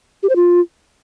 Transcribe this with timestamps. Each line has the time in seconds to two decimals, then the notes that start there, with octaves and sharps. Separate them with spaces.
0.23 G4
0.29 C5
0.36 F4